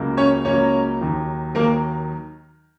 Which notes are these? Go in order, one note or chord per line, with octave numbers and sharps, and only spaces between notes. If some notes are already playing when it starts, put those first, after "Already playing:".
Already playing: C#2 C#3 F#3 A#3
C#4 C#5
C#2 C#3 F#3 A#3 C#4 C#5
D#2 D#3 F#3
D#2 D#3 F#3 A#3 A#4